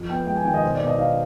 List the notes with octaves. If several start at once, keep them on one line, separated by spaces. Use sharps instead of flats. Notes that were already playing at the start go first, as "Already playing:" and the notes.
Already playing: F2
B3 G5
G#3 G5
G#5
D#3 G5
D#5
B2 C5
D5
B2
D#5
D#4 F5